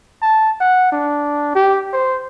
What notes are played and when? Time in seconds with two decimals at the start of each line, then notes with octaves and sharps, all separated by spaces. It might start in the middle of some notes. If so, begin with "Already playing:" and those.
0.22 A5
0.61 F#5
0.92 D4
1.55 G4
1.93 C5